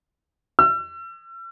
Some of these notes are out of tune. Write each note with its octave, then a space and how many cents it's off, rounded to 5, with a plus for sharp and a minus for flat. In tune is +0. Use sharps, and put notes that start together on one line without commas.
E6 +40